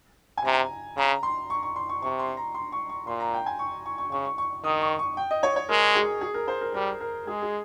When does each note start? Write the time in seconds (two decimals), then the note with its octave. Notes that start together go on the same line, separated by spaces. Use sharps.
0.37 G#5
0.45 C3 A#5
0.97 C#3 A#5
1.23 C6
1.50 C#6
1.63 C#6
1.76 C6
1.89 C#6
2.02 C3 C#6
2.19 C6
2.37 A#5
2.55 C6
2.72 C#6
2.89 C#6
3.07 A#2 C6
3.20 A#5
3.34 G5
3.46 G#5
3.59 C#6
3.86 C#6
3.98 C#6
4.11 C#3 C#6
4.25 C#6
4.38 C#6
4.64 D#3 D#6
4.81 C#6
4.99 C#6
5.17 G5
5.31 D#5
5.43 C#5
5.56 C#5
5.69 G#3 A#4
5.95 G#4
6.21 G#4
6.34 A#4
6.48 C5
6.61 A#4
6.74 G3 A#4
7.00 A#4
7.27 G#3 G#4
7.42 G#4